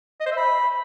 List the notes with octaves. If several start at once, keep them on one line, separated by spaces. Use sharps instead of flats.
D#5
C5
E5
B5